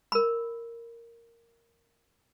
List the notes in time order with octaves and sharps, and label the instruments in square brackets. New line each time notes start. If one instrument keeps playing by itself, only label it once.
[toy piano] A#4 B5